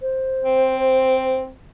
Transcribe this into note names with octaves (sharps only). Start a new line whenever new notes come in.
C5
C4